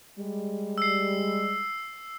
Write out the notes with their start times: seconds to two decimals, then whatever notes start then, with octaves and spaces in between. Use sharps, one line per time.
0.19 G3 G#3
0.78 E6 C7